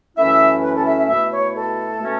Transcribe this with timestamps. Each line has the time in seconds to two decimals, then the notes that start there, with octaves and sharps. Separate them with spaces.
0.17 F#2 E3 A3 C#4 E4 E5
0.63 B4
0.75 A4
0.86 E5
0.97 E5
1.09 B2 A3 E4 E5
1.32 C#5
1.55 A4
2.01 B2 A3 C#4